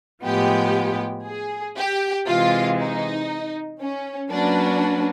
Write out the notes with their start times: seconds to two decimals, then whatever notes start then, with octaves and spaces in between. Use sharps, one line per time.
0.24 A2 F3 G#3 B3 G4
1.26 G#4
1.77 G4
2.27 C3 E3 G#3 F4
2.79 D#4
3.81 C#4
4.31 F#3 A#3 C#4 D4 F#4 B4